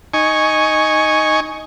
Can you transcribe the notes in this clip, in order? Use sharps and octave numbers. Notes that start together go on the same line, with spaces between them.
D#4 G#5 C#6